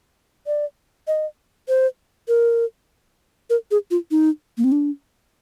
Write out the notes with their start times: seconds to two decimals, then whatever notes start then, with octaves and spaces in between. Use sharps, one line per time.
0.47 D5
1.08 D#5
1.68 C5
2.28 A#4
3.50 A#4
3.71 G#4
3.91 F4
4.11 D#4
4.58 A#3
4.64 C4
4.72 D4